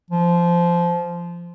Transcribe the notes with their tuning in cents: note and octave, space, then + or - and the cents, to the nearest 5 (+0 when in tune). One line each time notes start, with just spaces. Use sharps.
F3 -15